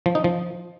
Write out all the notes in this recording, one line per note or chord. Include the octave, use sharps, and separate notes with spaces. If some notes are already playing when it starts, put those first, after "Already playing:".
F3
D#4
F3